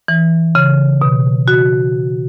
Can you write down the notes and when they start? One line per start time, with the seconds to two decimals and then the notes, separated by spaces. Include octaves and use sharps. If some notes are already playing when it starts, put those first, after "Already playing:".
0.08 E3
0.55 C#3
1.01 B2
1.48 F#4